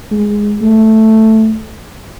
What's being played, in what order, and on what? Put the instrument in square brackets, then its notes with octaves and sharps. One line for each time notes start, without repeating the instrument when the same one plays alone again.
[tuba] G#3
A3